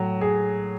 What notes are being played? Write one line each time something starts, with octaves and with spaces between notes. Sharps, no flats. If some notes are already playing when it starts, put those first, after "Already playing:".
Already playing: A2 F#3
G#4